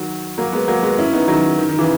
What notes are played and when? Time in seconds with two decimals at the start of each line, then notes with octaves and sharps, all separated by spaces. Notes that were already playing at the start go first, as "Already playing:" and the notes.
Already playing: D#3 F#3
0.38 F#3 A#3
0.53 G#3 B3
0.68 F#3 A#3
0.83 G#3 B3
0.98 C#4 E4
1.13 B3 D#4
1.28 D#3 F#3
1.58 D#3
1.69 D#3
1.79 C#3 E3